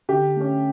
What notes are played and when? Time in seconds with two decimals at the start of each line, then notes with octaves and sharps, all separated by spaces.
0.09 D3 G4
0.36 A3 C#4